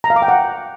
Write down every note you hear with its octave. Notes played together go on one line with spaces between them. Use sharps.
A#5
F5
D6
G5
F#5